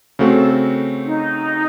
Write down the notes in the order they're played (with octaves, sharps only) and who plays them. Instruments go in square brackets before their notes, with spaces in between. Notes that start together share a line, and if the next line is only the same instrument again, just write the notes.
[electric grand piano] C#3 A3 C4 F#4 [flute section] A4
[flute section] D#4